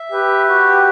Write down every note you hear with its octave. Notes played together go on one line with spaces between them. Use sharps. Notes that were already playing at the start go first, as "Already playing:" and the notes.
Already playing: E5
G4 B4
F#4